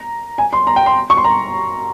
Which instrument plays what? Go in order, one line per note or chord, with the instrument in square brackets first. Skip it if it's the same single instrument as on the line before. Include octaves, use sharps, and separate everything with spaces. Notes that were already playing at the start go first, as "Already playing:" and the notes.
Already playing: [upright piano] A#5
G#5
C6
A#5
G5
C6
C#6
C6
A#5